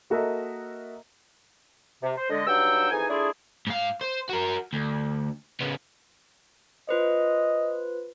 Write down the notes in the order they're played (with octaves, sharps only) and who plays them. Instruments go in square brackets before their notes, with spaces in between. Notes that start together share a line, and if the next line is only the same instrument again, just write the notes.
[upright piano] A#3 F#4 A4 A#4 D#5 E5
[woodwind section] C3
C5
D3 G#3 D#5
G2 F#3 D#4 F#5 G5 E6
F2 E3 D#4 G#4 G#5
A3 D4 E4 F4 G#4
[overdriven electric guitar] G#2 F5
C5
F#4 A#4
D2
C#3 B3
[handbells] F4 B4 C5 [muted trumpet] D#5